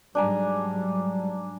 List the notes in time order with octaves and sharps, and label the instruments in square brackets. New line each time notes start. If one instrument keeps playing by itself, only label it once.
[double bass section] G#2 F#3 G3 [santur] D4 G#5 A#5